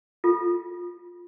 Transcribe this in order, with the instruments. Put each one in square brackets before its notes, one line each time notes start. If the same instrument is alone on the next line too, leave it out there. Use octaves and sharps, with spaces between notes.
[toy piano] F4 A4